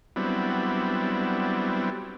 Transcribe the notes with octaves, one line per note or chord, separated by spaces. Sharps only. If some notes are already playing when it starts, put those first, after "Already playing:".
F#3 G3 B3 C4 D4 E4